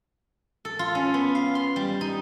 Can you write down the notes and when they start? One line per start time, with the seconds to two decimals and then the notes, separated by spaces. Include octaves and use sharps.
0.65 A4
0.79 F4
0.95 C#4
1.14 B3
1.35 F5
1.55 C6
1.76 G3
2.01 D#4